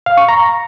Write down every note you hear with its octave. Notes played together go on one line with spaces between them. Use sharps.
F5
C#6
A#5